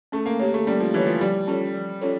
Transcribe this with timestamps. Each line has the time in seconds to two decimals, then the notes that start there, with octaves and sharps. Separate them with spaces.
0.12 A3 C#4
0.26 A#3
0.39 A#3 G4 C#5
0.54 A3
0.67 G3 C#4
0.80 F3
0.93 E3 G4 C#5
1.07 F3
1.21 F3 G3
1.48 C#4 F4 A4 C#5
1.74 F3
2.01 C#4 F4 A4 C#5